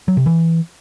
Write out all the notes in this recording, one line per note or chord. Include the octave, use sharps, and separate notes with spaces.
F#3
C3
E3